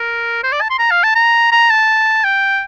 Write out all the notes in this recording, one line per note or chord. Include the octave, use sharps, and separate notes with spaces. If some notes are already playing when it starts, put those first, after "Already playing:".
Already playing: A#4
C5
D5
A5
C6
A#5
F5
A5
A#5
A#5
A5
G5